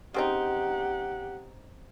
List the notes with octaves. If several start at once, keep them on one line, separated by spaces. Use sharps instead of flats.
C#3 C4 D#4 G4 F#5